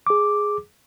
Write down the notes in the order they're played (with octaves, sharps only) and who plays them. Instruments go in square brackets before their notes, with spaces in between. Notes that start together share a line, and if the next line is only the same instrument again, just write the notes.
[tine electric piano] G#4 D6